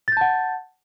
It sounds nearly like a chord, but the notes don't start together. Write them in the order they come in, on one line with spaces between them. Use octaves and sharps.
A6 G6 A5 F#5